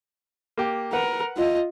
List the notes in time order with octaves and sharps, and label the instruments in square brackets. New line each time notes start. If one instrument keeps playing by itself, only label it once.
[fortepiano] A#3 G4
[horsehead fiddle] A#4 [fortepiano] B4 F#5
[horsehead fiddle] F4 D#5